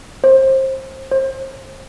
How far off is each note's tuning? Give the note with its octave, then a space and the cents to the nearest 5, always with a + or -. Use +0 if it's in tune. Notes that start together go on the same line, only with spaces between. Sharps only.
C5 +25
C5 +35